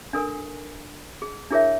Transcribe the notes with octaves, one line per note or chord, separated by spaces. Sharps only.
D4 A4 A#4 G#5
G#4
D4 E4 G#4 A#4 C#5 E5